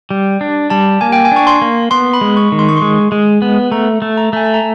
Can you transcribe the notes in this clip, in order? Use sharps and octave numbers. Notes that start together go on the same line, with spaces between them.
G3
D4
G3 A5
A#3 G#5
G5
G#5
D4 C#6
C6
A#3
B3 C6
B5
G#3
C#6
D#3
C6
C#6
G#3 C6
G#3
B3
A3 A#5
A3
A#5
A3 G#5
A5
A#5